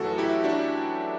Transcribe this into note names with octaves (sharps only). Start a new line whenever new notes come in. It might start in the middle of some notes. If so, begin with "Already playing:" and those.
Already playing: F#2 E3 A3 F#4 A4
E4 G4
D4 F#4